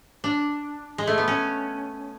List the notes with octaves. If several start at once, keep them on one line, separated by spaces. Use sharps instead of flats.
D4
G#3
A3
B3
C#4